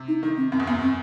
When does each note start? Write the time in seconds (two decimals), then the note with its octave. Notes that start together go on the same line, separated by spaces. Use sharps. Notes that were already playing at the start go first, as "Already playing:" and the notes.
Already playing: C3
0.08 D#4
0.23 D#3 D#4
0.37 C4
0.52 F#2 C4
0.60 E2
0.67 F#2 B3
0.81 C4